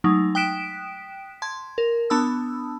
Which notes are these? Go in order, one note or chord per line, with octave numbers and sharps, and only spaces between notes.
F#3 G#3 A3 D#4
G5 D#6 F#6 B6 D7 E7
A5 C6 G#6
A#4
B3 D4 A5 B5 D#6 E6